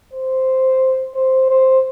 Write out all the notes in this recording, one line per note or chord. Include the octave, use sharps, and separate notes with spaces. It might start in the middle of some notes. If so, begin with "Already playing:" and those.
C5
C5
C5